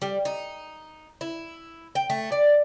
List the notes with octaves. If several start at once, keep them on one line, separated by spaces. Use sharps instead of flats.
G3
D#4
E4
G5
A3
D5